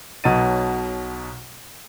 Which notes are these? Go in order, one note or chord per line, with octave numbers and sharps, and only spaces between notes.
B1 B2 F#3 D#5 A6 D#7